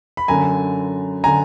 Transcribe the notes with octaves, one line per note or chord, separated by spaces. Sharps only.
B5
F#2 D3 G#5 A#5
D3 G#5 A#5